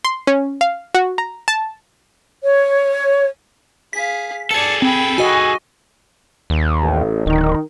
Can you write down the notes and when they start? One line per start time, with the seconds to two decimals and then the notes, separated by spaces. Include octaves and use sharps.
0.05 C6
0.27 C#4
0.61 F5
0.95 F#4
1.18 A#5
1.48 A5
2.43 C#5
3.93 G#4 F5 B6
4.51 G#4 A4 D5 A5 C#7
4.82 C4 G5 B5
5.18 F#4 D#5 G#5
6.50 D#2
6.82 A1
7.26 D1 D#3